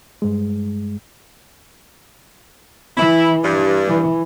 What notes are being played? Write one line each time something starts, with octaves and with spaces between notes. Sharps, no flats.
G2 G#3
E3 E4
G2
E3